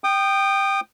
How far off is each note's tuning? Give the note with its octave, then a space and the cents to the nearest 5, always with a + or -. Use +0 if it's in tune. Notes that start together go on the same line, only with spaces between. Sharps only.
G5 +0 D#6 -30